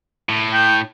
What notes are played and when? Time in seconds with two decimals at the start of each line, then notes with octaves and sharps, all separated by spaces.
0.29 A2
0.53 G5